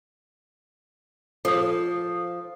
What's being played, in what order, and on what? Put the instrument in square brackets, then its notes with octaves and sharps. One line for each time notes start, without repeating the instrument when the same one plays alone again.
[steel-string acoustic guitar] F3 [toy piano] A4 D#6